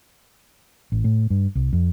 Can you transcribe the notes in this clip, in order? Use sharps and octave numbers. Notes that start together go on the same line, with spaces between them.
A1
A2
G2
C2
F2